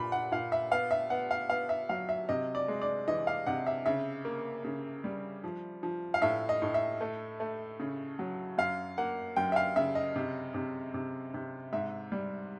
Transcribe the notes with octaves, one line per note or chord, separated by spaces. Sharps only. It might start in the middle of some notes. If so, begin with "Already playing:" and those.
Already playing: A#2 B5
F#5
A#2 F5
E5
B3 F5
E5
B3 F#5
F5
B3 F5
E5
F#3 F5
E5
C3 D#5
D5
G#3
D5
E3 D#5
F5
C3 F#5
E5
C#3 E5
A#3
C#3
G3
F3
F3
F5
A2 E5
D#5
A2
E5
A3
A3
C#3
F#3
F#2 F5
A#3 F#5
F#2 G5
E5
F5
C#3 E5
D#5
C3
C3
C3
C3
G#2 E5
G3